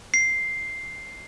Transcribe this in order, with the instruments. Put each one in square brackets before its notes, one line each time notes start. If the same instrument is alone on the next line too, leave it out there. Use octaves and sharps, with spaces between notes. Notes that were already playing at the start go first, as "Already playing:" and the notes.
[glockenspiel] C7